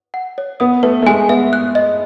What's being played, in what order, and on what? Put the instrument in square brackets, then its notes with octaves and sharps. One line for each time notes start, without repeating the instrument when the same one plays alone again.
[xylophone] F#5
C#5
[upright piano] B3 [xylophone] D#6
[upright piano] A3 [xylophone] B4
[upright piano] A3
[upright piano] G#3 [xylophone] G#5
[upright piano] B3 [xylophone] E5
[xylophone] F#6
D#5